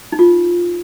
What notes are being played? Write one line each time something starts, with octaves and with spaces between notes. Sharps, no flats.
D#4
F4